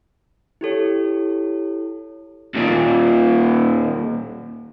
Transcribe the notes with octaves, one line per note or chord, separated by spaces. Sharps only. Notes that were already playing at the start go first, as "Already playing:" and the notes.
E4 G4 A4 C#5
D#2 A#2